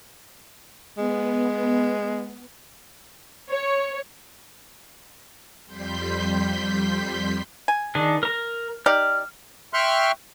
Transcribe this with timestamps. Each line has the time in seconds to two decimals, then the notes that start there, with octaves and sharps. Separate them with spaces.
0.98 G#3 B3
3.50 C#5
5.65 F2 G3 C6 G6 B6
7.68 G#5
7.95 D#3 D4 G#4
8.23 A#4 A#5
8.86 D#4 G4 D5 F6
9.73 E5 G5 C6 C#6 F6 F#6